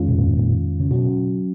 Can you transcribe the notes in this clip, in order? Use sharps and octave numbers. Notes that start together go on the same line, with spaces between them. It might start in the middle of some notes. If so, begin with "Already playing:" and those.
Already playing: F2 D#3 G#3 C#4 F4
B2
A#2
G#2
A#2
C#3
B2 F#3 C#4 F#4